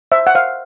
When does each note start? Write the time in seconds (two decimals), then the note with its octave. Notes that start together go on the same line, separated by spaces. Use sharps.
0.12 C5 E5
0.27 F#5
0.35 C5 F5